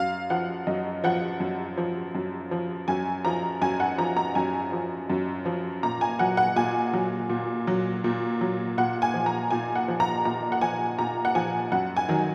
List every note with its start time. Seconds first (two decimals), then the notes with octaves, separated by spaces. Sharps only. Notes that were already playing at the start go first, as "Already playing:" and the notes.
Already playing: F#2 F5
0.30 F3 F#5
0.67 F#2 D#5
1.04 F3 F#5
1.40 F#2
1.77 F3
2.15 F#2
2.51 F3
2.88 F#2 G#5
3.25 F3 A#5
3.61 F#2 G#5
3.80 F#5
3.98 F3 A#5
4.17 A#5
4.35 F#2 G#5
4.72 F3
5.10 F#2
5.45 F3
5.83 A#2 A#5
6.01 G#5
6.19 F#3 F#5
6.37 F#5
6.56 A#2 G#5
6.93 F#3
7.29 A#2
7.67 F#3
8.04 A#2
8.41 F#3
8.77 A#2 F#5
9.02 G#5
9.14 F3
9.26 A#5
9.51 A#2 G#5
9.75 F#5
9.88 F3
10.00 A#5
10.25 A#2 A#5
10.52 F#5
10.61 F3 G#5
10.99 A#2 A#5
11.25 F#5
11.35 F3 G#5
11.72 F#2 F#5
11.96 G#5
12.09 D#3 F#3